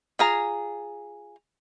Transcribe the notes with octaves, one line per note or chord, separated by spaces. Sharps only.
F4 G#4 A#5